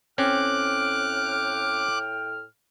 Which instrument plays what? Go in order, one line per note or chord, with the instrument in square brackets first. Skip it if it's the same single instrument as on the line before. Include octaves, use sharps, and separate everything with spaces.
[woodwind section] A2 G5 F6 [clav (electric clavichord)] C4 C#4 [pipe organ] D6 F#6